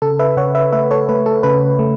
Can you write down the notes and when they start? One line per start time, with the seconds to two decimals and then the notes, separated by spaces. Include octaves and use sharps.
0.02 C#3 A4
0.19 B4 E5
0.37 C#3 C#5 F#5
0.55 B4 E5
0.72 A3 B4 E5
0.91 A4 C#5
1.09 A3 B4
1.26 A4
1.43 C#3 B4
1.79 A3